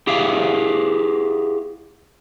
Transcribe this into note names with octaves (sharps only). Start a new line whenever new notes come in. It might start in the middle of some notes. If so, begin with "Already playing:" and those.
E4 G4 G#4 E5 F5